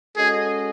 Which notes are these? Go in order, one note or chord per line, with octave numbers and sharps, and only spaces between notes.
G#3 C#4 F#4 G#4 A4 D#5